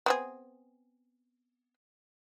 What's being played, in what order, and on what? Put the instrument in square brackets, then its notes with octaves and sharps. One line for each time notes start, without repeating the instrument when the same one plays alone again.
[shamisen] B3 C4 G#4